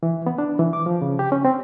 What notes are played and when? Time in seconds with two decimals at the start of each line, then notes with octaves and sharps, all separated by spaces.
0.03 E3
0.26 B3
0.38 D4
0.59 E3
0.73 D6
0.86 F3
1.02 C#3
1.19 G4
1.32 C#4
1.45 C4